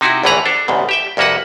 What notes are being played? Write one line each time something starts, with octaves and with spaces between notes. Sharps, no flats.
C3 D#4 E4 F#4
A#1 E2 A2 E3 B4 A#5
D4 A4
A1 D2 G#2 B2
G4 E5 G5
C2 F2 A#3 F#4 B4 F#5